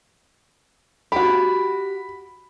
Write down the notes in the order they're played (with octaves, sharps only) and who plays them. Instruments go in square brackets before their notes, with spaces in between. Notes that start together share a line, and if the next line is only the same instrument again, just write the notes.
[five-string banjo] F#4 G4 [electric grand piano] B5